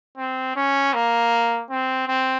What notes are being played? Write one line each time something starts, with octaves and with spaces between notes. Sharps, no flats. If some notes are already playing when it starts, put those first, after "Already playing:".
C4
C#4
A#3
C4
C4